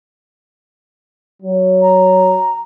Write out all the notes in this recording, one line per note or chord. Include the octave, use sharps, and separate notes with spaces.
F#3
A#5